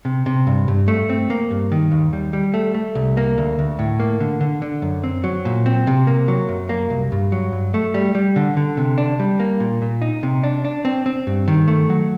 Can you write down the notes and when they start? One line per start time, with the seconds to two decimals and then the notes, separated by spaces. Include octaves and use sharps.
0.05 C3
0.26 C3
0.47 G2
0.68 G2
0.88 A3
1.09 C4
1.30 A#3
1.51 G2
1.72 D#3
1.92 D#2
2.13 G3
2.33 G3
2.54 A3
2.74 A3
2.95 C2
3.17 A#3
3.38 D2
3.59 D2
3.79 A2
4.00 A#3
4.20 D3
4.41 D3
4.62 D3
4.82 F#2
5.04 C4
5.24 F#3
5.45 A#2
5.66 C4
5.87 C3
6.07 A#3
6.28 F#3
6.49 F#2
6.69 A#3
6.90 C2
7.12 G2
7.32 F#3
7.52 G2
7.74 A3
7.94 G3
8.15 G3
8.36 D3
8.57 D3
8.77 C3
8.98 D4
9.20 G3
9.40 A#3
9.60 A#2
9.82 A#2
10.02 D#4
10.23 C3
10.43 D4
10.65 D4
10.85 C4
11.06 C4
11.27 G2
11.48 D#3
11.68 A3
11.90 F#3